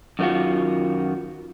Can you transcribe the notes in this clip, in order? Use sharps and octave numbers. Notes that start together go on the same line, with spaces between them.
F#2 D#3 A#3 F4 F#4